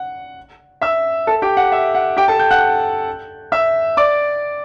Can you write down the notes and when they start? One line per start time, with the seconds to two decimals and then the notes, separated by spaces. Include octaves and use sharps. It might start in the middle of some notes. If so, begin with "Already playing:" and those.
Already playing: F#5
0.81 E5 E6
1.27 A4 A5
1.42 G4 G5
1.57 F#5
1.72 E5
1.95 F#5
2.17 G4 G5
2.28 A4 A5
2.39 G5 G6
2.51 F#5 F#6
3.52 E5 E6
3.97 D5 D6